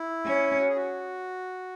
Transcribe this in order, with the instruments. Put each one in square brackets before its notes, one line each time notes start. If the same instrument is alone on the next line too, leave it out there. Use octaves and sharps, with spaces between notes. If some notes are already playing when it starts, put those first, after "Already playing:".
Already playing: [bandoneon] E4
[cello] C#4
[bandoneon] F#4
G#4
F#4